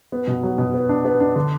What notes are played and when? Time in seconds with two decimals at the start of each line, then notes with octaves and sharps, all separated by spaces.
0.12 B3
0.27 B2
0.43 F#3
0.58 B2
0.74 B3
0.89 D4
1.05 B3
1.20 D4
1.36 D3